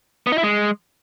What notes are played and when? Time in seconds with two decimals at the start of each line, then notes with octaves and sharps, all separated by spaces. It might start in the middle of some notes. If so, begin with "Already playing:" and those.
0.27 B3
0.32 D#4
0.38 E4
0.43 G#3